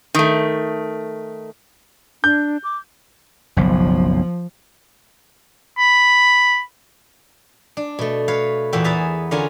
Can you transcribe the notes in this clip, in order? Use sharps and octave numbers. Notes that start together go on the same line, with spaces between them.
D#3 A3
D4 G6
D6
F#1 B1 F3
B5
D4
B2 A3
B4 C#5 F5
E2 A#2 F#4 B4 E5 G5
B3 G#4 B4 E5 A5 A#5
D3 C#4 F4 A#4 F#5 G#5